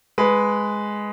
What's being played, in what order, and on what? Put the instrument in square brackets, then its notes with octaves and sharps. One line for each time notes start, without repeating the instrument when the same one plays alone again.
[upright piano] G#3 B4